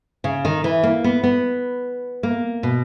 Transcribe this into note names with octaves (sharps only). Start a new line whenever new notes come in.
C#3
D#3
E3
A#3
B3
B3
A#3
B2